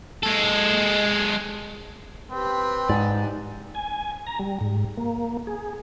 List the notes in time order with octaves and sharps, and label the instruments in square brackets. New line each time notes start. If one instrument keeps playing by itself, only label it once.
[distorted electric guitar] G#3 A4
[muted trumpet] C4 [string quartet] G4 B4
[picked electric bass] G#2 [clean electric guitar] D#4 D5
[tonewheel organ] G#5
A#5
G3
G#2
A#3
G#4